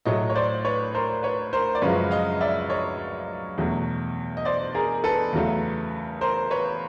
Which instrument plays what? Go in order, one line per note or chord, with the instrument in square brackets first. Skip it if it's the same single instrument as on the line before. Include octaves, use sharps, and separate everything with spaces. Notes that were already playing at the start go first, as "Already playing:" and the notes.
[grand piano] A2 F#3 A3 C#5 D#5
C#5
C5 D5
B4 C#5
A#4 C5
B4 C#5
A#4 C5
D5
F#2 C#3 F3 G#3 B4 C#5
D#5 F5
D5 E5
C#5 D#5
E2 B2 F#3 A3
D#5
C5 D5
G#4 A#4
A4 B4
E2 C#3 F#3 A3
A#4 C5
B4 C#5